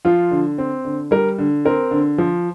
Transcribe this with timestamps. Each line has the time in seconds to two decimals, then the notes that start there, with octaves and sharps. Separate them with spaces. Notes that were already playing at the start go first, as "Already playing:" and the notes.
0.05 F3 F4
0.31 D3
0.58 C4
0.85 D3
1.11 G3 A#4
1.38 D3
1.65 C4 A#4
1.91 D3
2.18 F3